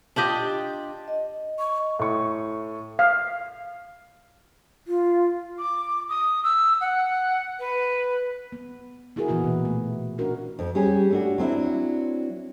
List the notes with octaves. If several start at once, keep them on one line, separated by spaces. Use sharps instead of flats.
D4 F4 G4 D#5
D#5
C#6
A2 C#6
F5
F4
D6
D#6
E6
F#5
B4
B3
B3 E4 F#4 G#4 A#4
A#2 E3 B3 E4 F#4
B2
A3
C#4 D4 F#4 A#4
F2
G3 C#4 G4 G#4
A3 D4 F#4
F#3 C4 D4 E4